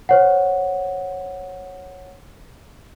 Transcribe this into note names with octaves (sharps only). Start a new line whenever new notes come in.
C5 C#5 F#5